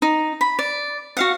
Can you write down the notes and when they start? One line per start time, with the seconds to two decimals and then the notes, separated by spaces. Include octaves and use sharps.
0.02 D#4
0.41 B5
0.59 D5
1.17 F#4 F5 F#5